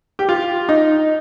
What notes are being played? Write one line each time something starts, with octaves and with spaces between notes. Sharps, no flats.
G4
F4
D#4